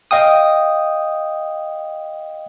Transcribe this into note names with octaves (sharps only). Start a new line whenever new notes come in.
D#5 F5 G5 D#6